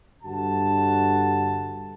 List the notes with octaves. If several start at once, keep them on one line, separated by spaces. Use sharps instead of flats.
G2 D3 F#4 A5